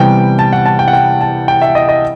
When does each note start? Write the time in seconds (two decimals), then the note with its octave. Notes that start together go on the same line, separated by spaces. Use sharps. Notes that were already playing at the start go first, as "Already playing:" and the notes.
Already playing: C3 E3 G3 B3 G5
0.39 A5
0.53 F#5
0.66 A5
0.79 G5
0.88 F#5
0.93 G5
1.21 A5
1.48 G5
1.62 E5
1.75 D#5
1.89 D#5